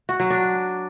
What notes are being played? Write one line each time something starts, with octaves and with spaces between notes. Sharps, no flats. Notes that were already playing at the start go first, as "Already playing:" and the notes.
F#4
F#3
D4